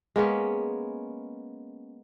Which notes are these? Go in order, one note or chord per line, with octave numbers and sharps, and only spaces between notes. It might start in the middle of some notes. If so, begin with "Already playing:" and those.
G#3 A#3 B3 C#4